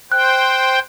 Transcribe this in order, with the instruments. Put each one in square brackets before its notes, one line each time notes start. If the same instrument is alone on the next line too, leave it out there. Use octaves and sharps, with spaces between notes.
[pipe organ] C5 G5 [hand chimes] F#6